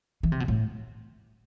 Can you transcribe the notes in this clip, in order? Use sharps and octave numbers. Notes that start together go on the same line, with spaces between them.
E3
C3
B2
A2